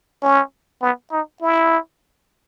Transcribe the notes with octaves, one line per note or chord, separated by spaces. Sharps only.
C#4
B3
D#4
E4